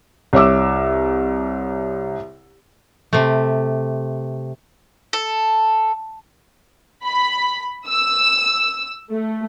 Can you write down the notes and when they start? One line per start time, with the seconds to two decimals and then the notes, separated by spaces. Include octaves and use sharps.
0.33 C2 C#5 E5 D6 E6
3.13 C3 A3
5.13 A4
7.05 B5
7.86 E6
9.12 A3